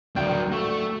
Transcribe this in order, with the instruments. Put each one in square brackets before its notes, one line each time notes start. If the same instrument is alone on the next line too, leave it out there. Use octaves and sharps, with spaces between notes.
[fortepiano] D2 G5 [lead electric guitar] F#3 D4
[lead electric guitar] A3 [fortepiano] F#4